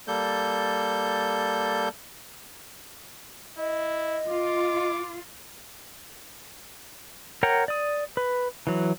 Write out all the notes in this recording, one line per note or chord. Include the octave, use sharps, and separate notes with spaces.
G3 A#3 A4 G6
E4 D#5
F4 D6
A#4 C#5 F#5 G5 A#5
D5 D#6
B4
E3 F#3